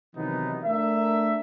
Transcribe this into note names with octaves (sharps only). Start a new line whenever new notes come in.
C3 D#3 E3 F#3 B3 D#4
A3 D4 A#4 E5